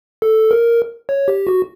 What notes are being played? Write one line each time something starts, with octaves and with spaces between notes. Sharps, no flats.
A4
A#4
C#5
G4
F#4